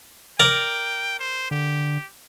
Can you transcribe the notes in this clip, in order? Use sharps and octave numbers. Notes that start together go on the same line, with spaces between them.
A#4 D5 G5 A#5
C5
D3 G4